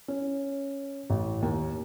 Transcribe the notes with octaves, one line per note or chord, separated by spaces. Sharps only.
C#4
A1
D#2